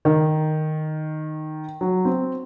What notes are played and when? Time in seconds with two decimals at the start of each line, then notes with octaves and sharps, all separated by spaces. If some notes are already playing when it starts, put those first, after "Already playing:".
0.05 D#3
1.81 F#3
2.05 C4